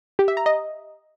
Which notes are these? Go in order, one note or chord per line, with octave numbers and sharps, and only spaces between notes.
G4
E5
A#5
D#5